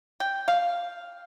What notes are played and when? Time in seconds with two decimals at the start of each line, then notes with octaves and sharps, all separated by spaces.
0.20 G5
0.48 F5